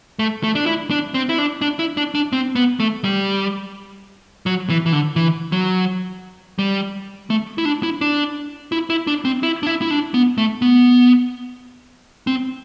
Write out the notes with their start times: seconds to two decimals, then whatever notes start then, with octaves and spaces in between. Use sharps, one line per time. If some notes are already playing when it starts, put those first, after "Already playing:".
0.19 A3
0.44 A3
0.55 D4
0.66 E4
0.90 D4
1.14 C4
1.29 E4
1.38 D4
1.62 D4
1.79 E4
1.97 D4
2.15 D4
2.33 C4
2.56 B3
2.80 A3
3.04 G3
4.46 F#3
4.70 E3
4.86 E3
4.93 D3
5.16 E3
5.52 F#3
6.59 G3
7.30 A3
7.58 E4
7.65 D4
7.83 E4
8.01 D4
8.72 E4
8.90 E4
9.07 D4
9.25 C4
9.43 E4
9.63 D4
9.67 E4
9.82 E4
9.91 D4
10.14 B3
10.38 A3
10.62 B3
12.27 C4